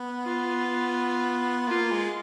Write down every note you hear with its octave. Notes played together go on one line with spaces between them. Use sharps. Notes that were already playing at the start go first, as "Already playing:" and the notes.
Already playing: B3
F4
A#3 F4
G#3